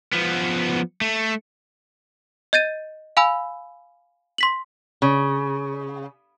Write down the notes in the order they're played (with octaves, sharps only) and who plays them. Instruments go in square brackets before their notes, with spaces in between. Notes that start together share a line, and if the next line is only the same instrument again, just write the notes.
[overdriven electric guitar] F3 B3
A3
[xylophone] D#5 G6 A6 D#7
F5 G#5 B5 E6
C6 B6 F#7
[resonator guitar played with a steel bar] C#3